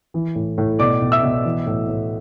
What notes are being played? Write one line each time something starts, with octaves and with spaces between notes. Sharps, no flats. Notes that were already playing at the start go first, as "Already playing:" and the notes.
E3
A2
A2
B2 D5 D6
B2
E5 E6
B2
E3
A2
A2